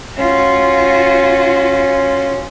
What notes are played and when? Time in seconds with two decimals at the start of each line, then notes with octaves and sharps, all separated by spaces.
0.18 C#4 F4 F#4